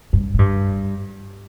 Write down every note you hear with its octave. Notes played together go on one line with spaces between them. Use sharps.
G2
A2
G2